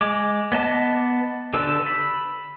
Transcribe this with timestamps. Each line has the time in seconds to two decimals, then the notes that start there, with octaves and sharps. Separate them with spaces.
0.01 G#3 D6
0.52 B3 D#5 A5 D6
1.54 D3 G4 A4 B4 E6
1.86 B5